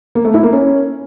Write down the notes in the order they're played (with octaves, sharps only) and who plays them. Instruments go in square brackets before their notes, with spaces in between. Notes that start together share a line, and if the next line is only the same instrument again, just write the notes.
[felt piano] A#3
A3
E4
A#3
C#4